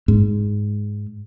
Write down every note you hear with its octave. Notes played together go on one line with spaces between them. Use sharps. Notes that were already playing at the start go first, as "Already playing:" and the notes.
G#2